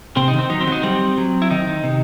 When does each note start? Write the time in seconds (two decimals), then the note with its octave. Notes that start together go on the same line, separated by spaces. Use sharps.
0.16 C3 C4
0.28 D#4
0.33 D#3
0.39 C4
0.50 F#3 D#4
0.61 C4
0.67 F#3 D#4
0.83 G3 C4
1.18 F#3
1.42 E4
1.51 D#3 D#4
1.84 C3